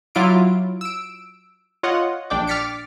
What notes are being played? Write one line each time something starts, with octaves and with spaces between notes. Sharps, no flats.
F#3 E4 F4 D6 D7
E6 D7
F4 C#5 D#5 F#5
A#1 D4 D5 G5 D6
D6 F6 A6 B6 C#7 D7